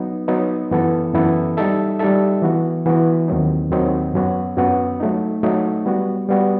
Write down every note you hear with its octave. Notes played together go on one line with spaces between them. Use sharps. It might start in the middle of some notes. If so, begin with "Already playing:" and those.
Already playing: F#3 B3 D#4
F#3 B3 D#4
F#2 E3 B3 E4 A4
F#2 E3 B3 E4 A4
G3 D#4 A4 E5
G3 D#4 A4 E5
E3 B3 F#4
E3 B3 F#4
D#2 D#3 F#3 C4 D#4
D#2 D#3 F#3 C4 D#4
F#2 F#3 B3 F#4
F#2 F#3 B3 F#4
F#3 A3 D#4
F#3 A3 D#4
G3 B3 F#4
G3 B3 F#4